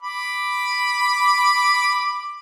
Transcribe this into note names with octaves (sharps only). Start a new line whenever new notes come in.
B5 D6